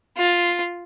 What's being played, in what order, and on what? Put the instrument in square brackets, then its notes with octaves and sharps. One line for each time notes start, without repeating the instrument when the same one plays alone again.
[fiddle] F4